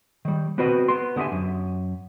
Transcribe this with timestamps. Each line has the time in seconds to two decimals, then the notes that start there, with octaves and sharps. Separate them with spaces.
0.25 D#3 G3
0.58 B3 C4 F#4 B4 D#5
0.88 B3 C6
1.16 D3 B3 G4 E5 G#5
1.32 F#2